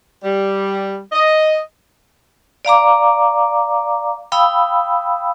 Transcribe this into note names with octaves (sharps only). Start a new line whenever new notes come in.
G3
D#5
D5 F5 A#5 D6
F5 G5 B5 D#6 E6